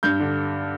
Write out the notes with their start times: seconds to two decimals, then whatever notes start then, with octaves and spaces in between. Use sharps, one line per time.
0.03 G2 G6
0.20 D3